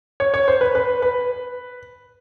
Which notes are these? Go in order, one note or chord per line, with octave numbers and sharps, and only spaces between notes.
C#5
C#5
C5
B4
B4
B4